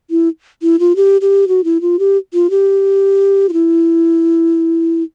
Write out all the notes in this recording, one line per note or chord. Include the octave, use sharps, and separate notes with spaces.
E4
E4
F4
G4
G4
F#4
E4
F4
G4
F4
G4
F4
E4